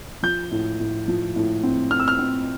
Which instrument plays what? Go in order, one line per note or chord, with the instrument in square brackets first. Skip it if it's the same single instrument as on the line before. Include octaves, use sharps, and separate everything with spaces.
[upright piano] F3 [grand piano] G6
[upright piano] A2
A2
F3
A2
C4
[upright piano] C4 [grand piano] F6
[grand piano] E6
F6
[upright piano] C4